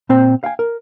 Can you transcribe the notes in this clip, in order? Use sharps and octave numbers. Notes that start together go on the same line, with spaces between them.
A#2 C4 C5 G5
F5 G5 G#5
A#4